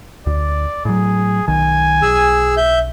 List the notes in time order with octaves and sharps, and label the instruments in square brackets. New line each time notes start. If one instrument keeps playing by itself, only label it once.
[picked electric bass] D2 [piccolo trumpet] D5
[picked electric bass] A2 F#3 [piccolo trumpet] G#4
[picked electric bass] B1 D#3 [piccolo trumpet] G#5
[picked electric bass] B1 [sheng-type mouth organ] G#4 E6
[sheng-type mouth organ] E5 G6